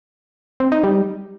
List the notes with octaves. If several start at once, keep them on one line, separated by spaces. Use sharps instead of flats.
C4
D#4
G3